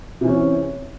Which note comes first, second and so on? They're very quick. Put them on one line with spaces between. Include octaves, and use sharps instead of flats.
C3 E3 C#4